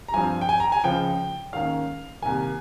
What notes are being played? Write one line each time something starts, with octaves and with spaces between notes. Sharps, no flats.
A#5
G2 F3 C4 G#5
G5
G#5
A#5
G#5
C#2 C#3 F3 G5
G#2 D#3 A#3 C#4 F5
C2 C3 D#3 A#3 G#5